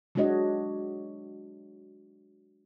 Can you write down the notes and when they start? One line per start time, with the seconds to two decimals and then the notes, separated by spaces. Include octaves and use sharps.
0.15 F#3 G#3 D4 F#4 C#5 D#5